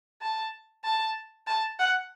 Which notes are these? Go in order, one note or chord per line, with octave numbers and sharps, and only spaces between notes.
A5
A5
A5
F#5